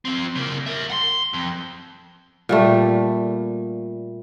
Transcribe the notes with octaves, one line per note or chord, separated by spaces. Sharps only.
F3 C4
C#3 A#3
A#4 E5
F#5 C6
F2
A#2 G3 A3